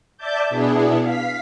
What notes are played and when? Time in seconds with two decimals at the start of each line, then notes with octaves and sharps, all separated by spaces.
0.17 D5 E5 A5 D6 G6
0.49 B2 B3 D4 E4 G#4
1.01 F5 B6